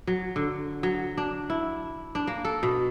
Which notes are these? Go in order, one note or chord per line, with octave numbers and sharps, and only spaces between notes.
F#3
D3
F#3
D4
E4
D4
A#3
A4
B2